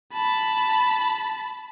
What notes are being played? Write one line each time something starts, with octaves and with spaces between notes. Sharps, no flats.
A5 B5